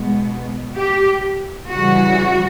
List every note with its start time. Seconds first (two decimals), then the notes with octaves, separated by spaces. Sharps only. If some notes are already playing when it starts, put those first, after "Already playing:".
Already playing: B2 G#3 B3
0.77 G4
1.71 C#3 E3 G3 F#4